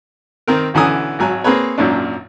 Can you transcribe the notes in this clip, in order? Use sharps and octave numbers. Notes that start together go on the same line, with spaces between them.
D#3 C4 A#4
B1 D3 E3 C#4 G#5 D#6
G#1 F#3 G#5
A#3 C4 G#4 B4 C#5
G#1 F#2 A#2 C#4 D4